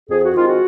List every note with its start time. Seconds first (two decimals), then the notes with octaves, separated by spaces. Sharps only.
0.10 F2 G#4
0.22 F#4
0.35 D#3 G#3 C4 F4
0.48 F#4